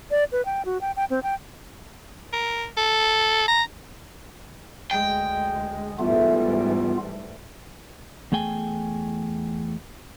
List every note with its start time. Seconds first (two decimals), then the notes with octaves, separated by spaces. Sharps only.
0.11 D5
0.32 B4
0.45 G5
0.65 F#4
0.81 G5
0.96 G5
1.10 C4
1.23 G5
2.33 A#4
2.77 A4
3.48 A#5
4.91 D2 G#3 G5
5.99 G#2 E3 G3 A3 B3 F4
8.32 E2 A3 G#4 G5 G#5